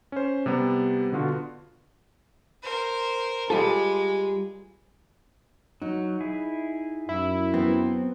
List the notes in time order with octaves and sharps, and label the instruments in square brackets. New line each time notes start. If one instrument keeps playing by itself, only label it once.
[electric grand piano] C#4 C5
C3 G3 B3
B2 D3 B3 F4 F#4
[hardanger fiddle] A#4 C5
[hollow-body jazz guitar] G3 F4 A4 [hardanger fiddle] G#3
[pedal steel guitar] F#3 [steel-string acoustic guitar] D#4
[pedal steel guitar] E4 G#4
[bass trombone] F#2 [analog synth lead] E4
[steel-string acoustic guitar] F#3 B3 [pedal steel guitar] C4